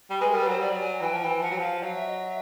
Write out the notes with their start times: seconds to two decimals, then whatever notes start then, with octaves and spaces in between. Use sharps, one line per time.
0.10 G3
0.20 G#3 B4
0.31 A#4
0.34 G3
0.41 B4
0.47 F#3 C5
0.59 G3 D5
0.70 F#3
0.81 G#5
1.01 E3 G5
1.13 F3
1.22 E3 G5
1.42 F3 F#5
1.51 F#3
1.58 F3 F5
1.83 F#3 F5
1.95 E5
2.07 D#5
2.19 E5